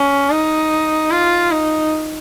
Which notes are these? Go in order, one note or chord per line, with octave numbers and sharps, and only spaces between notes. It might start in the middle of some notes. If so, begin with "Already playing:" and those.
Already playing: C#4
D#4
F4
D#4